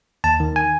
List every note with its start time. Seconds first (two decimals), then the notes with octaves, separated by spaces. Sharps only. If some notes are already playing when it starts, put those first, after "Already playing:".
0.24 D#2 A5
0.40 D#3
0.56 G#5